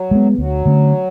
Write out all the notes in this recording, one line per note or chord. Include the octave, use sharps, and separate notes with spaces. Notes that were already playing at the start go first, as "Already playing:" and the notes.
Already playing: F#3
G#3 B3
D2 F#3
D3 A3 C#4